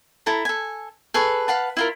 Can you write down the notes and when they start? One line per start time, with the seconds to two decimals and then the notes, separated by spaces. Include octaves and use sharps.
0.26 E4 A4 A5 A#5
0.45 A4 G#5
1.14 G#4 A4 B4 C#6
1.48 B4 F5 F#5 A5
1.77 E4 F4 A#4